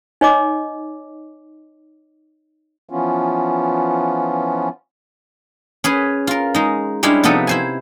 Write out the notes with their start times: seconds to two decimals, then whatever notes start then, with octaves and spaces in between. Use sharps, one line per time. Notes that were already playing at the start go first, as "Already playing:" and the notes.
0.21 D#4 C#5 D#5 D6
2.90 E3 F3 B3 C#4 F4
5.84 C#4 G#4 B4
6.27 F4 A#4
6.54 G#3 D#4
7.03 G3 G#3 C#4 D4 E4
7.24 C3 F3 B3 D#4 A4 B4
7.47 E4 C5 G#5